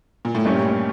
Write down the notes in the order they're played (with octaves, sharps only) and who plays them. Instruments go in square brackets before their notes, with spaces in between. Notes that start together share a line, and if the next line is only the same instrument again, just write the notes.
[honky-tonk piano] A#2
A2
[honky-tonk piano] G2 [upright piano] A#2 A3 C#4 G4 C#5